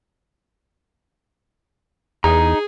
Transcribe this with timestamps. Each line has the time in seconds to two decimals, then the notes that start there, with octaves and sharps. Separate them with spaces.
2.24 E2 D#4 G#4 A#5